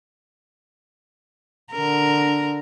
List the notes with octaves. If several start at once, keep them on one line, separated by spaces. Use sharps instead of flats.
D3 A#4